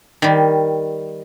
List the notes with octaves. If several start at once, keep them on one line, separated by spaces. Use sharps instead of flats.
D#3 G3